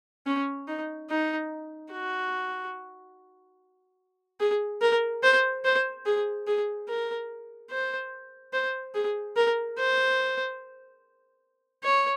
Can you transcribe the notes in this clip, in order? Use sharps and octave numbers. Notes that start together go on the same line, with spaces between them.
C#4
D#4
D#4
F#4
G#4
A#4
C5
C5
G#4
G#4
A#4
C5
C5
G#4
A#4
C5
C#5